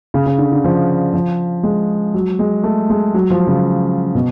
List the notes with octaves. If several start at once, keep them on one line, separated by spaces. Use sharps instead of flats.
C#3
C#3
D3
D3
F3
F3
G#3
F#3
G#3
A3
G#3
F#3
F3
C#3
B2